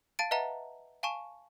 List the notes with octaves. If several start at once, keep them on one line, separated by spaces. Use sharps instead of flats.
F5 A5 A6 D7
B4 D#5 E5 F#5 A5 A#5
F5 G#5 A5 C#6 E7